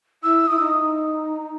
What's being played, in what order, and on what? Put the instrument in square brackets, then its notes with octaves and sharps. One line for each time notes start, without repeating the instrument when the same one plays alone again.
[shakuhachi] E4 [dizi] E6
[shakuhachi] E4 [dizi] D#6
[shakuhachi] D#4